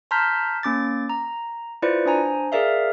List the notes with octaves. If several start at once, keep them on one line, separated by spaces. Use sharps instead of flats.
A5 A#5 C6 F6 G6 B6
A#3 C#4 D6 A6
A#5
E4 F4 B4 C5 D5 C#7
D4 C5 G#5 A#5
G#4 A#4 D5 E5 F5